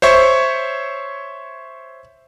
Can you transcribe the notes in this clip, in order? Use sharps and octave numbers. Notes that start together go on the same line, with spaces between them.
C5 C#5 E5 C#6